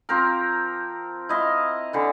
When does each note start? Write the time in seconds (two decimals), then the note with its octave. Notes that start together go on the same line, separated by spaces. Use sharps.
0.09 F3 C4 A#4
1.29 E4 D#5 F5 C6
1.93 D3 E3